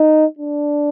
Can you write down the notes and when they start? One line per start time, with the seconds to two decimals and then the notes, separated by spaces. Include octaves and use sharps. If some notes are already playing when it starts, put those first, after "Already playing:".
Already playing: D#4
0.39 D4